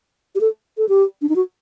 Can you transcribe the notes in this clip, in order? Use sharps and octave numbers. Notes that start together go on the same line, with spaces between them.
G4
A4
A4
G4
D4
D#4
F#4